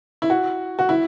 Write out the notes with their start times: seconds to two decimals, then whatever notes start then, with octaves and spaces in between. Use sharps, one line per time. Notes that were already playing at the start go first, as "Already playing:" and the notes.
0.22 E4
0.30 F#4
0.79 F#4
0.89 E4